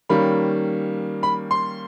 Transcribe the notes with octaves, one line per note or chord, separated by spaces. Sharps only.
D#3 G3 A#3 C#4 B5
B5
C6